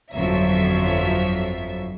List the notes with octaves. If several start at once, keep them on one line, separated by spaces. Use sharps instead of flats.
G1 F2 F3 F#3 E5